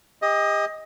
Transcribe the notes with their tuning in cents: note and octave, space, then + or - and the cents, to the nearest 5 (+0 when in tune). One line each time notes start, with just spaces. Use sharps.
G4 +40 D#5 +15